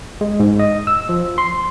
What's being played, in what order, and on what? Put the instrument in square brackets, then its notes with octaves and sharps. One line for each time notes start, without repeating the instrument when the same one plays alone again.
[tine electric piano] G#3
G#2
D#5
E6
F3
C6